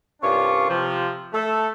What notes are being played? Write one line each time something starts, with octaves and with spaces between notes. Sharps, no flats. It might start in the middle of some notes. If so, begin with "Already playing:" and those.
C2 G2 C#4 D4 F4 C#6
C3 F3
A3 A4